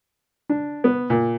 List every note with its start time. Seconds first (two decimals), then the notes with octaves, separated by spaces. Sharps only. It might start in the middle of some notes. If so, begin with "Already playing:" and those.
0.49 D4
0.84 B3
1.10 A#2